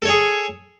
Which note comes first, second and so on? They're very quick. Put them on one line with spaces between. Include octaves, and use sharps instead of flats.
A4 C#5 G#4